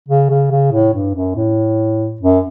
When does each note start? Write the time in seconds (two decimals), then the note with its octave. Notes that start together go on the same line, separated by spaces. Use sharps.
0.09 C#3
0.30 C#3
0.51 C#3
0.72 A2
0.93 G2
1.15 F#2
1.36 A2
2.21 F#2